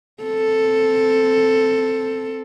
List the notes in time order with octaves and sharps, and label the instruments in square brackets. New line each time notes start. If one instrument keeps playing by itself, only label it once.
[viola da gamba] C4 A4